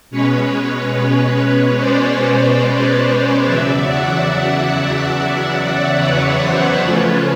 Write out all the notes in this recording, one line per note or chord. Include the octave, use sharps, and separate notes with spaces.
B2 G#3 C#4 B4 C#5
C5 D5
E2 C#3 F#3 D5 E5
E5 F#5
E5 F#5
B4 C#5
C5 D5
C#3 F3 A3 C#4 F4 B4 C#5